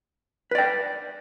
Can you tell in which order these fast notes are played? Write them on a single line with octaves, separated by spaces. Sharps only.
B4 D5 G5